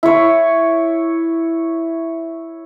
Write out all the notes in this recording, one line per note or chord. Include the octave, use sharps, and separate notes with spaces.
E4 C#5